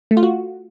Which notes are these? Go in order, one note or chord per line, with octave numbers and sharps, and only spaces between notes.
A3
F4
F#4